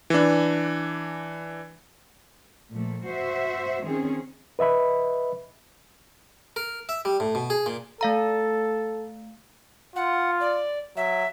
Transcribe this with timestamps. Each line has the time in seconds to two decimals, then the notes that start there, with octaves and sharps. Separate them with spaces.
0.10 E3 D4
2.71 A#2 F3 A3
3.05 F#4 C5 E5
3.85 D#3 C4 C#4 G#4
4.59 B4 D#5 E5 B5
6.56 A#4
6.89 E5
7.05 G3
7.20 A2
7.35 B2
7.50 G#4
7.66 A#2
8.01 A3 A4 F5 A#5
9.96 F4 F#5
10.40 D5
10.97 F#3 E5